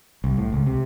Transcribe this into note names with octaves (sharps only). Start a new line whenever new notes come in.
C2
A2
C#2
C3